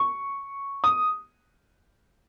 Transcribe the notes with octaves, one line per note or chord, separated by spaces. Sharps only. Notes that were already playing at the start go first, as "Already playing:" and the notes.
Already playing: C#6
D#6